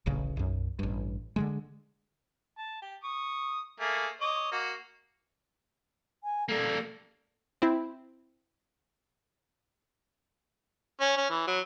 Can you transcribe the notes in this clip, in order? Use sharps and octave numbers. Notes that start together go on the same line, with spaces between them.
D1 A1 C#3
B1 F#2
A1 G2
D3 D#3 G#3
A5
G4
C#6 D#6
A3 A#3 G#4
C#5 D#5 D6
A#3 F#4
G#5
G3 A#3 A4
C4 E4
C#4
C#4
E3
F#3